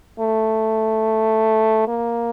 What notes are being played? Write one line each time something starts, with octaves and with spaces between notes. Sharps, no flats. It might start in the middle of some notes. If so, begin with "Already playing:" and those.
A3
A#3